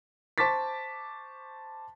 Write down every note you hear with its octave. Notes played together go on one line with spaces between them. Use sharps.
C5 A5 C#6 D6 A6 B6